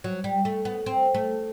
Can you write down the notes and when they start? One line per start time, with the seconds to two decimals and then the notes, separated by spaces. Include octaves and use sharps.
0.04 F#3
0.24 G3
0.45 A3
0.65 B3
0.86 C4
1.14 A3